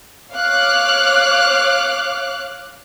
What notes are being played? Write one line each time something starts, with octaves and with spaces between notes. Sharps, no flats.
C#5 F5 D6 F6 F#6